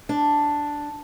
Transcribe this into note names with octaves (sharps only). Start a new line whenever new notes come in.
D4